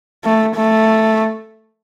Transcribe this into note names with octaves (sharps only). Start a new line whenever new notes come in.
A3
A3